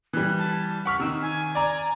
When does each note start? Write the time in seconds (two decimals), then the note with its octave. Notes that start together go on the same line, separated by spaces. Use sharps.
0.13 E3 G3 F#6
0.38 A5
0.86 F#5 C#6 F6 B6
1.00 C3 D#3 E6
1.21 G#5
1.55 D5 A#5